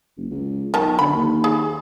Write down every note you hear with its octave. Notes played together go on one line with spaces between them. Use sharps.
F#1
C#2
B1 D#3 A5
D3 B5
D#2
G#4